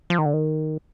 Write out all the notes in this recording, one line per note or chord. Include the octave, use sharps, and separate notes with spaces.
F3
D#3
D3
D#3